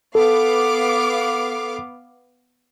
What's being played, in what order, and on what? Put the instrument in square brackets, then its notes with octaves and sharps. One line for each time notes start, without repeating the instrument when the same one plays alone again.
[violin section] B3 F5 D6 [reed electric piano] A4